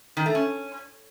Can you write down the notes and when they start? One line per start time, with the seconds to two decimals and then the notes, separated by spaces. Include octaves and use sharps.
0.17 D#3
0.26 A3
0.35 C#4